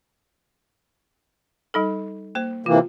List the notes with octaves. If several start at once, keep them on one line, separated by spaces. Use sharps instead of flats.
G3 D#4 A4
A#3 C5
C3 E3 A#3 F4